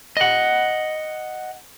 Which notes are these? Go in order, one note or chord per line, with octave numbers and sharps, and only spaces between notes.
D#5 F#5